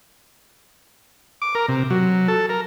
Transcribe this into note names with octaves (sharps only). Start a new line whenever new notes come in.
D6
A#4
C3
F#3
A4
A#4